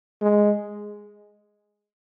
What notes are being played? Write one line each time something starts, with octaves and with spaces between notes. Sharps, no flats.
G#3